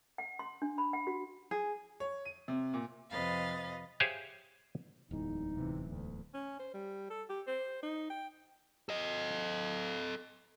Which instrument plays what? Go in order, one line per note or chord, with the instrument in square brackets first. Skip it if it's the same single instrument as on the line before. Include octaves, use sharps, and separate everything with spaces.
[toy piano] F#5
C6
D4
B5
F#5
F#4
[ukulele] G#4
[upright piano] C#5
D#7
C3
A#2
[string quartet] F2 C3 B4 D#5 F5 A6
[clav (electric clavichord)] G4 G#4 C5 C#5 E5 F5
[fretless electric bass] D1 E2 G#3 [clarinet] D#4
[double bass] C3 E3
D2
[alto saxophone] C#4
C5
G3
A4
G4
C5
D#4
G5
[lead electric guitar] A4 D#5